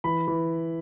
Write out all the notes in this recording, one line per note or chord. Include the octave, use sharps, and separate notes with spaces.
E3 B5
E3